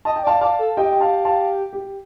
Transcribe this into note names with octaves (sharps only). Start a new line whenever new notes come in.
D#5 A5
G5
D5
F5 A5
D5 F5 A5
A4
G4 D#5 G5
G5
F5 A5
F5 A5
G4